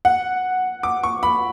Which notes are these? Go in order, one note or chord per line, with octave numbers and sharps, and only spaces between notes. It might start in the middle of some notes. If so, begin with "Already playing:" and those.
F#5
D6
C#6
B5